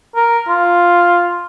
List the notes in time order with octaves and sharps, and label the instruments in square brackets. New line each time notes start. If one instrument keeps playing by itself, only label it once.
[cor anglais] A#4
F4